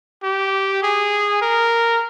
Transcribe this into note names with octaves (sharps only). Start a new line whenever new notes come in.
G4
G#4
A#4